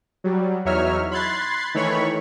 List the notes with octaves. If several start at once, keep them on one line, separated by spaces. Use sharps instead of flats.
F#3 G3
E2 F#3 D#4 C#5 E5 F6
B5 C6 F#6 G#6 A6 C7
D#3 E3 A3 C#5 B5 C#6